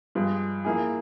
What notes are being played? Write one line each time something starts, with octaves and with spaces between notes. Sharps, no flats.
G2 F3 G#3
F3 A#3 E4 G#4